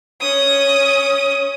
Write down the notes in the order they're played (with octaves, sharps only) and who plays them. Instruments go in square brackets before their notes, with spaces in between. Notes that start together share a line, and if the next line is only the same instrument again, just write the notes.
[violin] C#4 D#6